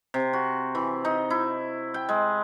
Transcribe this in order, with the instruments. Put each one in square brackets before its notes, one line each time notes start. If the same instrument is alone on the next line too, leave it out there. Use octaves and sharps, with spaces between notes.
[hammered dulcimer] C3
F#4
E3
D#4
E4
G5
G#3